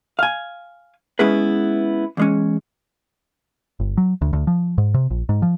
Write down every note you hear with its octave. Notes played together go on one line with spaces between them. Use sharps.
F5 G#5
G#3 B3 C#4 E4 G#4 B4
E2 G#3 C#4
G1
F#3
D2
D2
F3
G#2
C3
A#1
G#2
F3